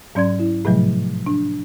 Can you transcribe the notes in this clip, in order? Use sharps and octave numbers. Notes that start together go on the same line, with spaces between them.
G#2 F#3 C#4 D5 C6 G#6
E4
A2 C3 F3 F#3 A3
D4